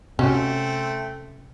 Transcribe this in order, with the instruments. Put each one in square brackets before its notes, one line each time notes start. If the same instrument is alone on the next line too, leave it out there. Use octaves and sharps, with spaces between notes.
[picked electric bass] C3 [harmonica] A3 C4 [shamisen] C#4 F#4